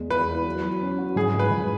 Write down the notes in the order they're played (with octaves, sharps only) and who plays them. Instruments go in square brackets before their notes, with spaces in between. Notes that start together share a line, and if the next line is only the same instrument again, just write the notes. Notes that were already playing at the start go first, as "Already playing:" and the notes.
Already playing: [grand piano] E2 G#3
[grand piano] E2 [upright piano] B4
[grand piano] E4
F#3
F#3
C#4
F#4
[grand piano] G#2 [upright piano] G#4
[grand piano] G#2
[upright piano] B4
[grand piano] G#2